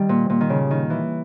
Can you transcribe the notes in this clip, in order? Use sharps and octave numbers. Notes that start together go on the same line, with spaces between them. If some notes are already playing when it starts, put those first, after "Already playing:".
Already playing: D#3 G3
A#2
A#2
D#3
C#3
D#3
E3